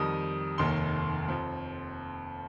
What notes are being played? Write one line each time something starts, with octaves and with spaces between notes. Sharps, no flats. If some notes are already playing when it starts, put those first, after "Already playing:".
Already playing: F2 D#3 G3 D#6
F1 D#2 D#3 C6
F2 F3